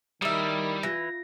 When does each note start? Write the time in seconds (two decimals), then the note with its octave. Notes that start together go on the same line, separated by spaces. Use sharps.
0.22 D#3 G3 A#3 E4 D#6
0.83 E3 F4 A#6